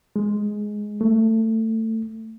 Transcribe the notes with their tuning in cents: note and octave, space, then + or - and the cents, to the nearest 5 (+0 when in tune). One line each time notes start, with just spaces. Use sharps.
G#3 +5
A3 +20